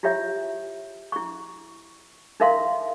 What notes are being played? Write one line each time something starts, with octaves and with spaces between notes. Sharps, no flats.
E4 F4 G4 C#5 E5
E4 C#6
D#4 E4 A#4 E5 F5 C6